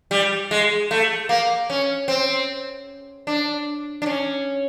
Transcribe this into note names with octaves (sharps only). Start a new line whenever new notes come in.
G3
G#3
A3
A#3
C#4
C4
D4
D4
C#4